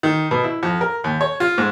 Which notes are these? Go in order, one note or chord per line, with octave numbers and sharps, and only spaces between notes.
D#3
B2
E4
F2
A#4
D#2
C#5
F4
G#2